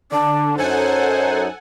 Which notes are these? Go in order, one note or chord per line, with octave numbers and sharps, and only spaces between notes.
D3 D4 D5
F#2 F#3 D#4 A4 C5 C#5 F#5 G#5